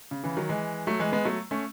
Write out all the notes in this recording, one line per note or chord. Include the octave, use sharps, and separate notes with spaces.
C#3
C#3 E3
D#3 F#3
E3 G#3
F#3 A3
E3 G#3
G#3 B3
F#3 A3
A3 C#4